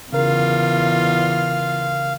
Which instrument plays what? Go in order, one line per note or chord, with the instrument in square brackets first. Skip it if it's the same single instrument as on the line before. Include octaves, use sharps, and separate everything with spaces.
[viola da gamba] E2 F4 [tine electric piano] C#3 A#4 [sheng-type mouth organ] F5